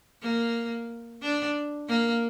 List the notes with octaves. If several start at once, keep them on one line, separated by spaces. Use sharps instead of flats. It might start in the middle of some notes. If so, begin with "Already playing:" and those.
A#3
D4
A#3